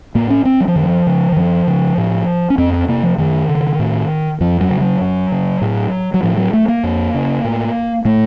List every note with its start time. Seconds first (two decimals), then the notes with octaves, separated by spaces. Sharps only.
0.15 A2 A#3
0.30 C#4
0.45 C4
0.60 F#3
0.68 F3
0.76 F#2 D#3
0.83 F3
1.07 C#3
1.32 D#3
1.36 F#2 F3
1.67 C#3
1.98 A2
2.50 C#4
2.58 F2 C4
2.73 C4
2.88 C3 A#3
3.03 F3
3.18 F#2 D#3
3.49 C#3
3.79 A2
4.40 F2 F3
4.61 F#3
4.70 C#3
4.81 F#3
5.01 F#2
5.32 C#3
5.62 A2
6.14 F#3
6.23 A2 F3
6.37 F#3
6.53 A3
6.68 A#3
6.83 F2
7.14 C#3
7.44 A2
8.05 A2 A3